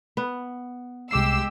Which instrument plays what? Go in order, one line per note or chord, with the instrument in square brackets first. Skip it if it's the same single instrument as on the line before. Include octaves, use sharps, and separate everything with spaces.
[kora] B3
[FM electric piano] C2 D6 C7 [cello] G#3 G4 [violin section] E6